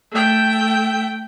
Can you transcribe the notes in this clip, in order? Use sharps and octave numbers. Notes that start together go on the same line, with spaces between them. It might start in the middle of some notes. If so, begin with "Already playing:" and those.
A3 G5